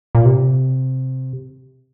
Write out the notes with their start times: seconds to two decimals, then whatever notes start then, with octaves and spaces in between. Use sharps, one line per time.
0.15 A#2
0.25 C3